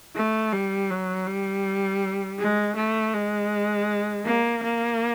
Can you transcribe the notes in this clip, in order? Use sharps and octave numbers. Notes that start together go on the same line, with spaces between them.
A3
G3
F#3
G3
G#3
A3
G#3
A#3
A#3